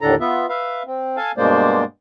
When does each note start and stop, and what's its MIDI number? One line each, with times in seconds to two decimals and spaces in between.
0.01 0.15 39
0.01 0.15 45
0.01 0.15 50
0.01 0.15 62
0.01 0.15 69
0.01 0.15 82
0.20 0.46 59
0.20 0.46 65
0.20 0.46 76
0.49 0.83 71
0.49 0.83 76
0.49 0.83 77
0.87 1.17 60
1.17 1.32 69
1.17 1.32 77
1.17 1.32 80
1.17 1.32 81
1.37 1.84 43
1.37 1.84 47
1.37 1.84 56
1.37 1.84 58
1.37 1.84 72
1.37 1.84 74